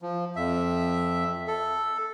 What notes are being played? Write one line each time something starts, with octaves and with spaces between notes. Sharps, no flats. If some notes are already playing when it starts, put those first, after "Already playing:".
F3
F2 E5
A4